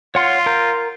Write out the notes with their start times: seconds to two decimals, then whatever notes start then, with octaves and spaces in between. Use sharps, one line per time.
0.15 F4 C#5 F#5 C6
0.46 A#4 A#5 G6